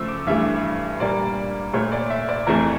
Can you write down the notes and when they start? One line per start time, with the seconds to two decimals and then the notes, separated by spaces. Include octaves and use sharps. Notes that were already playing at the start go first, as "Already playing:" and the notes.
Already playing: C#3 F3 A3 E6
0.08 D6
0.27 G2 E3 A3 E5
1.00 A#2 G3 A#3 D5
1.73 A#2 A3 C#5
1.92 D5
2.10 E5
2.29 D5
2.47 F2 E3 A3 A#4